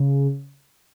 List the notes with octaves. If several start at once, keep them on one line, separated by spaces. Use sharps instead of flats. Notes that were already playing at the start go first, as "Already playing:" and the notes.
Already playing: C#3